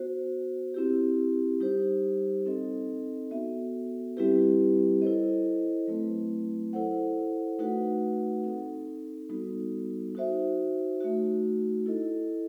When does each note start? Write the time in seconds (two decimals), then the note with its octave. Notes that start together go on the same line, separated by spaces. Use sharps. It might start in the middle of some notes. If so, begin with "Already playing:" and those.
Already playing: B3 F#4 C5
0.74 C4 E4 G4
1.60 G3 D#4 G4 C5
2.46 C4 D#4 A4 D#5
3.31 B3 F#4 A4 E5
4.17 G3 C4 E4 G4 B4
5.02 E4 A4 C5 D#5
5.87 F#3 A3 C4 E4 B4
6.73 E4 A4 C5 F#5
7.59 A3 D#4 F#4 B4 F#5
8.44 C4 D#4 A4
9.29 G3 B3 D#4 F#4 A4
10.15 D#4 F#4 C5 E5
11.00 A3 D#4 F#4
11.86 E4 A4 D#5